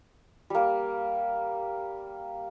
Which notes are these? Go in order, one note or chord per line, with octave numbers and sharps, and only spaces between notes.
G3 A#3